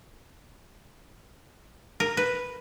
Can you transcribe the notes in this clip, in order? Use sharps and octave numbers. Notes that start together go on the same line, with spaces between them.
A#4
B4